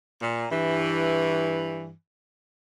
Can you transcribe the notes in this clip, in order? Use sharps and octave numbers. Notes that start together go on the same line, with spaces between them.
A#2
G2 E3